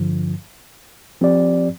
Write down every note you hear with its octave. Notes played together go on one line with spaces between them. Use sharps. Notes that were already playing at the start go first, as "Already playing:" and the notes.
Already playing: G2 D3 F3
F3 C4 G4 D5